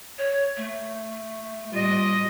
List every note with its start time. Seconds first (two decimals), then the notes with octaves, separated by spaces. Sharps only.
0.18 C#5
0.57 A3
1.72 G3 F4 D#5